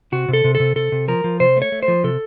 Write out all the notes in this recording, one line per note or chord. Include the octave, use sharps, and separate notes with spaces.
C3 F#4
C3
A4
C3
A4
C3
C3 A4
C3
F3 A#4
F3
C3 C5
A3
C#5
A3
C5
F3
C3 A4